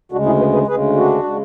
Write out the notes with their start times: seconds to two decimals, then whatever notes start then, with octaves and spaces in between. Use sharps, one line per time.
0.12 D2 C#3 G#3 D4 F#4
0.26 E4 G#4
0.39 G#4 B4
0.53 G#4 B4
0.67 D2 C#3 G#3 G#4 B4
0.95 D4 F#4
1.24 C#3 G#3